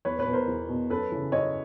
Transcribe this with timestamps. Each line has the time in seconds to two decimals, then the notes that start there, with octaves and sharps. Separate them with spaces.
0.05 E2 B4 C#5
0.19 B4 C#5
0.27 B2
0.33 A#4 C5
0.47 E2
0.69 B2
0.90 F#2 A4 B4
1.12 C#3 E3
1.32 F#2 C#5 D#5